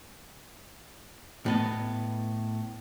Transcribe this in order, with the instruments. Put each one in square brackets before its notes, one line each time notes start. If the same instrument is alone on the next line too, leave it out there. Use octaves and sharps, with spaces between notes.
[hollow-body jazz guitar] A2 B3 D#5